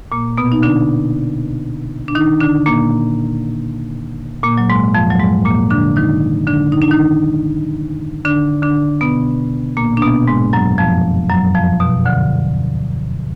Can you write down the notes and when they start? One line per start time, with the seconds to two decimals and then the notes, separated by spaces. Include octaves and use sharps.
0.12 A#2 A#3
0.38 B2 B3
0.52 D#4
0.63 D3 D4
2.08 D4
2.15 D#3 D#4
2.40 D3 D4
2.66 A#2 A#3
4.43 A#2 A#3
4.58 F#3
4.70 G#2 G#3
4.94 F2 F3
5.10 F#3
5.20 G#2 G#3
5.45 A#2 A#3
5.70 D3 D4
5.96 D#3 D#4
6.47 D3 D4
6.72 D#4
6.81 D4
6.91 D#3 D#4
8.25 D3 D4
8.62 D3 D4
9.01 B2 B3
9.77 A#2 A#3
9.97 D4
10.02 B2 B3
10.28 G#2 G#3
10.53 F#2 F#3
10.78 F2 F3
11.30 F#2 F#3
11.55 F2 F3
11.80 B2
12.05 D2 D3